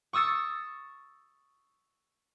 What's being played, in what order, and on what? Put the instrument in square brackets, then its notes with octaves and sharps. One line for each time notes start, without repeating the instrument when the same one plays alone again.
[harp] C#6 D#6 E6 A6 C#7